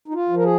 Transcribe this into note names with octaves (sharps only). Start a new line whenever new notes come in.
D#4
F4
F3
A#4
G#4